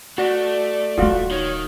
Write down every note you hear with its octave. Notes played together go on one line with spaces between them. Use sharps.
A3 F#4 D5
D#1 A#3 F4 F#4
D#3 C#5